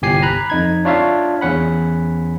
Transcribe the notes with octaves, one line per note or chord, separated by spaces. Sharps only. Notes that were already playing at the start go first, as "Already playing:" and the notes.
G1 C2 G4 G#5 C7
A#5 B5 F#6
F2 D#4 G#6
D4 F4 C#5 E5 F5
E2 C#4 F#5 B5